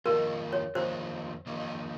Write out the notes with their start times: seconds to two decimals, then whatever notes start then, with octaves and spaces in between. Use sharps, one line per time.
0.06 F2 D#3 A#3 F4 A#4
0.53 C#5
0.75 F2 D#3 A#3 F4 C5
1.47 F2 D#3 A#3 F4